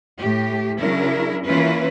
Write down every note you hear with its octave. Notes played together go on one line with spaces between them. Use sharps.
A2 G4
C#3 F#3 D4 E4 A#4
E3 A#3 C#4 E4 F4 B4